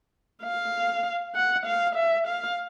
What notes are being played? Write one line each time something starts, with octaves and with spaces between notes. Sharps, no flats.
F5
F#5
F5
E5
F5